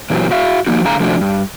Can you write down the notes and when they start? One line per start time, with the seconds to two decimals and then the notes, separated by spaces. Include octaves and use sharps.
0.10 A#2 E3 F#3 C4 G4
0.31 F#4 E5 F5
0.67 F3 A#3 D#4 F#4
0.85 A2 D3 G#4 F5 A#5
1.00 C3 F3 A3 D4 F#4
1.21 G2